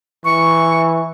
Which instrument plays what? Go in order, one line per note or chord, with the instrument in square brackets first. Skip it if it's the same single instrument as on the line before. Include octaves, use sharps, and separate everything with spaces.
[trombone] E3 [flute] C#6